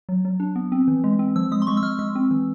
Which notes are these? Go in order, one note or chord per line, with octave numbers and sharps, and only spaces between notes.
F#3
F#3
D4
B3
C4
E3
G#3
C4
F3 E6
G#3 D#6
C6
G#3 C#6
E6
G#3 F6
G#3 E6
C4
E3